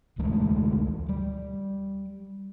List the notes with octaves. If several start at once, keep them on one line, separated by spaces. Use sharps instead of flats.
D2 E3 G#3 A3
G3